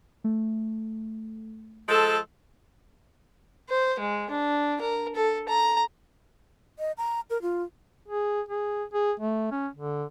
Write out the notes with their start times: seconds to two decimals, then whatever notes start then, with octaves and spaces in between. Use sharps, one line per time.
0.24 A3
1.88 F3 G#3 A4
3.69 C5
3.99 G#3
4.30 D4
4.81 A#4
5.16 A4
5.48 A#5
6.79 D#5
6.97 A#5
7.30 A#4
7.42 F4
8.08 G#4
8.49 G#4
8.94 G#4
9.20 A3
9.51 C#4
9.76 D3